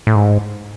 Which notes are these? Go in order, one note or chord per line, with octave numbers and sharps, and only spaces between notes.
A2
G#2